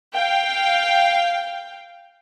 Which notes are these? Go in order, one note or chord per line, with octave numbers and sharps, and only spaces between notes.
F5 G5